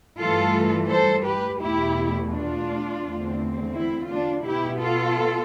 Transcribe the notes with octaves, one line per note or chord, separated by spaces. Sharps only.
G2 E3 A3 F4 A4
A4 C5
G4 B4
E2 B2 A3 E4 G4
D4 F4
E2 D3 A3 C4
E4
D4 F4
B2 B3 E4 G4
F4 A4